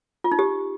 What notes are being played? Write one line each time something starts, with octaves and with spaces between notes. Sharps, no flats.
F4
D#4
G4